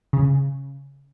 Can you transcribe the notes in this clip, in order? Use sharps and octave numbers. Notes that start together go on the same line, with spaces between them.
C#3